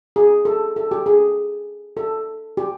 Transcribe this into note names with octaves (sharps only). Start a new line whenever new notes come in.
G#4
A4
A4
G4
G#4
A4
G4